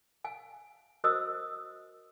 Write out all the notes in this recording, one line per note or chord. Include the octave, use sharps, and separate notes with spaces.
F5 G#5
F#4 A#4 C5 D#5 D#6 E6